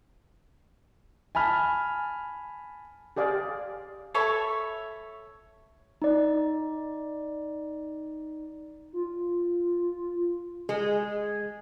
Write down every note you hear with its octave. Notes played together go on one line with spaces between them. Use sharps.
G#5 A5 B5 F6
G4 G#4 D5 F5
A4 C#5 E5 B5
D#4 D5
F4
G#3 G#4